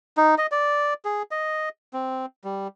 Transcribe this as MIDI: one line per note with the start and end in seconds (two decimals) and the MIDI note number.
0.17 0.35 63
0.38 0.47 75
0.51 0.94 74
1.05 1.22 68
1.31 1.69 75
1.93 2.26 60
2.44 2.68 55